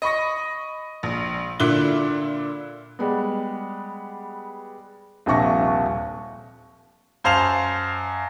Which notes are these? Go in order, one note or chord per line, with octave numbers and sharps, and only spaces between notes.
D#5 B5 C#6 A#6
A#1
A#2 D3 E4 E5 F#6 G7
G3 G#3 B3
D#1 A#1 C3 A5 C#6 A#6
F#2 C5 F5 A5 F7